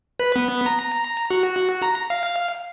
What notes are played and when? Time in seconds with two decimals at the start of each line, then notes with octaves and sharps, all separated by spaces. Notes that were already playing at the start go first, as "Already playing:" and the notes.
0.20 B4
0.36 B3
0.66 A#5
1.31 F#4
1.82 A#5
2.10 F5